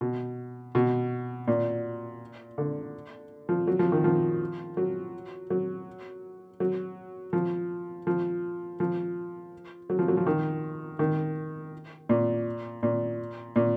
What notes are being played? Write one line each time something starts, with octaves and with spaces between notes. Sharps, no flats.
B2
B2
A#2
D3
F3
F#3
F3
D#3
F3
F#3
F#3
F#3
F3
F3
F3
F#3
F3
F#3
F3
D#3
D#3
A#2
A#2
A#2